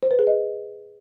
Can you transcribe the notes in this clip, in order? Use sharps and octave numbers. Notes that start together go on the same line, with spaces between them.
C5
B4
G#4
D#5